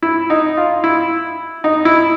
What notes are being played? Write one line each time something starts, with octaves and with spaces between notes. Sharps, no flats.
E4
D#4
F4
E4
D#4
E4